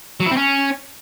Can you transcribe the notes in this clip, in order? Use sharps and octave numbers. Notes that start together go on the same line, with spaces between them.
F#3
E4
C4
C#4